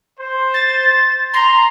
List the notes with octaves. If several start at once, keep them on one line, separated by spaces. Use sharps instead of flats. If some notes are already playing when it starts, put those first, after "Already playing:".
C5
A6
A#5 C6